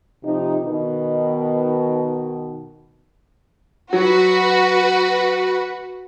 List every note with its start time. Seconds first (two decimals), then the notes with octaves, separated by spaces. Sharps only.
0.25 C3 F3 D#4
0.63 B2 D#3
3.93 F#3 F#4 B4